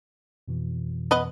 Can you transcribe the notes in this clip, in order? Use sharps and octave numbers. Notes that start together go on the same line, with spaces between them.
F2 B2 E3
B3 B4 D#5